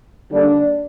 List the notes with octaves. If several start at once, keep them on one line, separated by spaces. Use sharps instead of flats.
D3 G3 A#3 D4